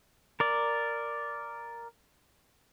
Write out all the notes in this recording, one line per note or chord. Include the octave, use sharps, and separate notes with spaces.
A#4 D5